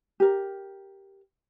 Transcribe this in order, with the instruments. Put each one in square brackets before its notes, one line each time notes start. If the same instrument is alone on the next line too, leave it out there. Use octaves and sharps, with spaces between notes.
[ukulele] G4 A#4